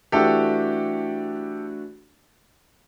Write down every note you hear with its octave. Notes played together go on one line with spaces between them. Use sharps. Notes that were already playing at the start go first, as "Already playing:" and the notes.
E3 A3 D4 F#4 G4 A4